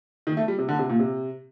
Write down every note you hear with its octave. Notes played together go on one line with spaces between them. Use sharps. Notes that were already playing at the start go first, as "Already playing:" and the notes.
D#3
A3
G3
C3
D3
C3
A#2
C3